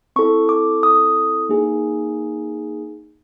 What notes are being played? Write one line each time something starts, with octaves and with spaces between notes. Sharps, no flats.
C4 E4 A4 C#6
D6
D#6
A#3 D#4 G#4